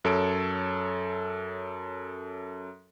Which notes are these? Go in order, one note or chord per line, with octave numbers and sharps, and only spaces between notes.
F#2 A4 C#5 A5 D7